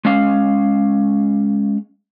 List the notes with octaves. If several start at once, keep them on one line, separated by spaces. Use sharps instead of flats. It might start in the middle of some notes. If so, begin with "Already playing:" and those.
G#3 C#4 F5